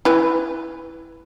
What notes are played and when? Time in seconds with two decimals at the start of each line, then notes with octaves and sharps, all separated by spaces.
0.05 E4 B4 G#5